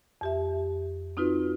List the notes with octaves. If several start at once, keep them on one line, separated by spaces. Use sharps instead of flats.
F2 G4 E5
C4 D#4 F4 F#4 B4